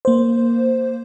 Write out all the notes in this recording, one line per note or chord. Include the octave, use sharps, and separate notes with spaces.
A#3 C5